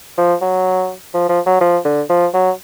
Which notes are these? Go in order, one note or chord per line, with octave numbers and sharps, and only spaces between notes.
F3
F#3
F3
F3
F#3
F3
D3
F3
F#3